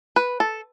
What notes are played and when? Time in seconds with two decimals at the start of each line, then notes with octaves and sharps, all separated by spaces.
0.16 B4
0.40 A4